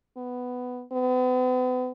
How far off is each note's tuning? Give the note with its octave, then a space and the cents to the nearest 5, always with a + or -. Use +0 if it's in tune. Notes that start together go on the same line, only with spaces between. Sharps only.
B3 +10
B3 +40